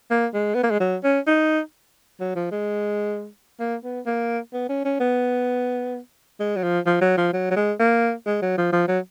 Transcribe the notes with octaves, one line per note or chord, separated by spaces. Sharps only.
A#3
G#3
B3
A#3
G#3
F#3
C#4
D#4
F#3
F3
G#3
A#3
B3
A#3
B3
C#4
C#4
B3
G#3
F#3
F3
F3
F#3
F3
F#3
F#3
G#3
A#3
G#3
F#3
F3
F3
F#3